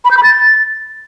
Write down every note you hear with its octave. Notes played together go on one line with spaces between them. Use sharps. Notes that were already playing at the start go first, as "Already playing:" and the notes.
B5
G6
B5
A6